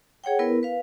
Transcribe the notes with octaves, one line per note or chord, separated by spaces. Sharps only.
G#4 C#5 F#5 G5
B3 E4 A#4 B4
B4 F5